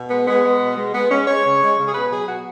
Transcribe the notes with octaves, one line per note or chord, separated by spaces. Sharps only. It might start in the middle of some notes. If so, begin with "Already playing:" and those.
Already playing: B2
G#3 B3
G#3 B3
G#3
B2
G#3
G#3 B3
G#3 C#4
G#3 C#5
C#3
G#3
C#3
G#4
B2 B4
F#3 G#4
B2 F#4